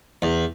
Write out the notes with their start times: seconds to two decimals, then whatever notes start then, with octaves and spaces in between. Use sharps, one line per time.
0.22 E2